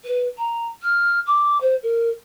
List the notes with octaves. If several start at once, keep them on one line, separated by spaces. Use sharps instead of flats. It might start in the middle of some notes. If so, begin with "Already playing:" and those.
B4
A#5
F6
D6
C5
A#4